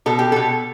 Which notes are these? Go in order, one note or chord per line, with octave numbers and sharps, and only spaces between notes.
B2 A4
G4
B2 A4